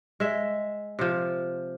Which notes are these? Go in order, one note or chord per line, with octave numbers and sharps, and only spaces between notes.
G#3 E5
C3 F3